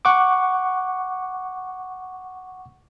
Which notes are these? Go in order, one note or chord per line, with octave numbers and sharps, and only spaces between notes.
F#5 C#6 D6